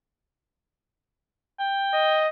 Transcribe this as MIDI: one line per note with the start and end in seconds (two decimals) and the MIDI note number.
1.59 2.26 79
1.93 2.28 75